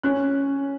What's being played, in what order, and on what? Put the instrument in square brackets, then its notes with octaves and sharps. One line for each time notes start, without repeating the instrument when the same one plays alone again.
[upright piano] C#4 F#6